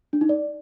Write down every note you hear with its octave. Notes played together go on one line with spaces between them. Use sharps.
D4
D#4
D5